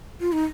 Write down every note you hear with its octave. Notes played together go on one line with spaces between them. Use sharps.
F4
D#4